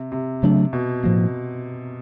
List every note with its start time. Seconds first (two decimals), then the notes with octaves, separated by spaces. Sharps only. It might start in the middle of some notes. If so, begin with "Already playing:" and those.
Already playing: C3
0.12 C3
0.43 C#3 F#3 A3 D4
0.73 B2
1.03 A2 F3 A#3